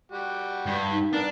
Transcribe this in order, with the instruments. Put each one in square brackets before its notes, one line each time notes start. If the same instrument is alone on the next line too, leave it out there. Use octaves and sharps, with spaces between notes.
[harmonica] G3 F#4 G4
[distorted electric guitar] G2
[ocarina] D#4
[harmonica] B3 A#4 [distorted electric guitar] D4